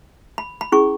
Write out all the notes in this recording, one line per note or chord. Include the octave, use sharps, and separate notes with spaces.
B5
B5
C#4 E4 G#4 C#6